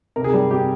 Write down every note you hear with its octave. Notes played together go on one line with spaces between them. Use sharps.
C3 A#4
G#4
G3
C3 G4